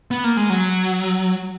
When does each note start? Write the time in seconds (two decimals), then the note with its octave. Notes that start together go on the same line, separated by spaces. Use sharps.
0.11 B3
0.24 A#3
0.37 G#3
0.50 F#3